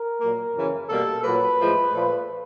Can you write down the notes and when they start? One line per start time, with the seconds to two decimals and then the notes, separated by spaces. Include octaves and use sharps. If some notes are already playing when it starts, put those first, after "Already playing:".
Already playing: A#4
0.20 A#2 F#3 A#3
0.53 F#2 C#3 E3
0.88 B2 G3 A#3 A4
1.23 A#2 F#3 A#3 B4
1.57 A2 F3 G#3
1.92 A#2 F3 A3